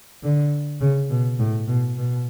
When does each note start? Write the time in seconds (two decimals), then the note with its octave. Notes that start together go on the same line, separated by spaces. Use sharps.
0.23 D3
0.81 C#3
1.10 B2
1.39 A2
1.68 B2
1.97 B2